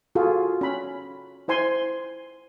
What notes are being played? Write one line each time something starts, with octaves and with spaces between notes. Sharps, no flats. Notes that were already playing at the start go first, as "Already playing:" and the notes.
F4 F#4 G#4 A4
C#4 B5
E4 C5 G#5 C6